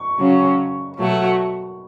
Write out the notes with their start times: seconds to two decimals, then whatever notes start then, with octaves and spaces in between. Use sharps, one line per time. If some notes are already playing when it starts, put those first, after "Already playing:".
Already playing: C#6
0.19 C#3 F#3 C#4
0.98 B2 F#3 A3 F#4